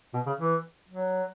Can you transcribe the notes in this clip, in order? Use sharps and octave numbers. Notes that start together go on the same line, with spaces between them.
B2
C#3
E3
F#3